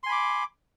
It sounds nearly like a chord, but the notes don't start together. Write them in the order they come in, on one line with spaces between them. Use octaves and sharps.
C6 G#5 B5 D6